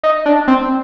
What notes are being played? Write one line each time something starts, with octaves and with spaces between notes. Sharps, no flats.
D#4
D4
C4